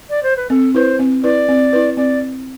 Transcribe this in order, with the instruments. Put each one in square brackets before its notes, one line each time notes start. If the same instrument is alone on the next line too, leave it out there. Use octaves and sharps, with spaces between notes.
[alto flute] D5
C5
B4
[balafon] C4 [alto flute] A4
[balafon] E4 B4 [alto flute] C5
[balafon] C4
[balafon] E4 B4 [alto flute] D5
[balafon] C4
E4 B4
[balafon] C4 [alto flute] D5